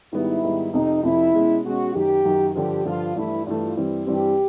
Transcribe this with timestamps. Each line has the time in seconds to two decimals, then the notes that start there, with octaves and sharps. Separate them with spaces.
0.13 G#2 D#3 G3 B3 E4
0.43 G#2 D#3 G3 B3
0.73 F2 C3 F3 D#4
1.03 F2 C3 F3 E4
1.34 B2 G#3 C#4
1.65 B2 G#3 C#4 F#4
1.94 F#2 D#3 F#3 G4
2.25 F#2 D#3 F#3
2.55 G2 D3 F3 G4
2.85 G2 D3 F3 F4
3.16 G2 E3 A3 E4
3.46 G2 E3 A3 F4
3.77 G2 E3 G3 C4
4.06 G2 E3 G3 C4 G4